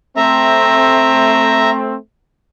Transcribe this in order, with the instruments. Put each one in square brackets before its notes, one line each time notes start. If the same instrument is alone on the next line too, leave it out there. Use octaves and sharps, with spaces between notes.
[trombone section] A3 C4 [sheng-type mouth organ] E5 A#5